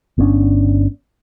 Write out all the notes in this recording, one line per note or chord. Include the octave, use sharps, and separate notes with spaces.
G1 B3 C#4 D4